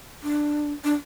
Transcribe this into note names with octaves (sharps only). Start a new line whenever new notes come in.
D4
D4